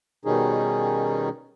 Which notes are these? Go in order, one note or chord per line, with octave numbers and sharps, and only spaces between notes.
B2 D#3 G3 C#4 D#4 G#4